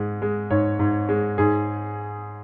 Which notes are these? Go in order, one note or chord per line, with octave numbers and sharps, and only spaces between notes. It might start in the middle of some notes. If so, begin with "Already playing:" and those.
Already playing: G#2 G#3
G#3
G#2 C#5
G#2
G#3
G#2 G#4